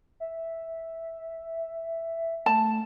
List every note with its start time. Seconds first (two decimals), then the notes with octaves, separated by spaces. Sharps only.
0.20 E5
2.46 A3 A5